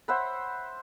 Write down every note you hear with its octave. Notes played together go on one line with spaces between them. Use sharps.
C5 E5 F#5 B5